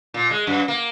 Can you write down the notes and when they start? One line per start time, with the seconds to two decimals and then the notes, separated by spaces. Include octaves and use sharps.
0.14 A#2
0.31 G#3
0.47 F#2
0.68 A#3